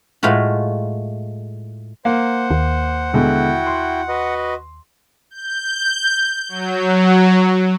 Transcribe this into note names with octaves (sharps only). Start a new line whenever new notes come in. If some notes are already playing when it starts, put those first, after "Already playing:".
A2 G#3 A3 F4 F#4
A#3 C5 F#5
D#2
B2 D3 G#3 E4 F#4 G5
C6
F#4 B4 D#5
G6
F#3